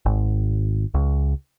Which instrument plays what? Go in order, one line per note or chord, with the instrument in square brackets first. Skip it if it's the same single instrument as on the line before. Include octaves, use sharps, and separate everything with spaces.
[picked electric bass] G#1
C#2